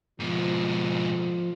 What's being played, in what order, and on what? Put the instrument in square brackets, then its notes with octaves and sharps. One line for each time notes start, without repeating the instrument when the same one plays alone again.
[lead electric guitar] G#2 B2 [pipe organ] F3